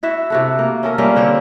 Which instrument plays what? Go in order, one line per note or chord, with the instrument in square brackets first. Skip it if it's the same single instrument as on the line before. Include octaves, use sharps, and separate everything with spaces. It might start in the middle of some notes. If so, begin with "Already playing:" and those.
[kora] E4 F#4 E5
C3 F#4 A4
A#3
C#4 A4 A#4
G3 A#3 C#4 F4
D3 C4 C#5